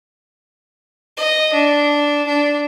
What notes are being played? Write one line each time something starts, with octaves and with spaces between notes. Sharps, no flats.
D#5
D4
D4